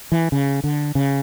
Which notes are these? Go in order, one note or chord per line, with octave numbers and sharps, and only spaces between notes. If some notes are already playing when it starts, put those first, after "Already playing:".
E3
C#3
D3
C#3